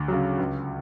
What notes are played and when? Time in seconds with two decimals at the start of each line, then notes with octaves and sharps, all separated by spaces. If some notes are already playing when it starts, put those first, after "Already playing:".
Already playing: D2
0.08 C#3 F#3
0.38 C#2